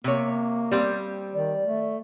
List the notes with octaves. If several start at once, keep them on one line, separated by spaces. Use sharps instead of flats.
C3 A#3 C#5
G3 C4
D#3 D5
A3